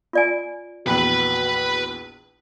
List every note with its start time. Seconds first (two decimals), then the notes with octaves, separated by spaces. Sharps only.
0.13 F4 D5 G#5
0.87 A#1 E2 F#4 B4 B5